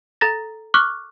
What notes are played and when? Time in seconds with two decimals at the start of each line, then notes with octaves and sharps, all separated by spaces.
0.21 A4 A#5 A6 A#6
0.74 C#6 D6 F6 F#6